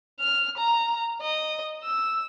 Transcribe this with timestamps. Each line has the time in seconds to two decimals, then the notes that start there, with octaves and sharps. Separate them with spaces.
0.20 F6
0.58 A#5
1.21 D#5
1.83 E6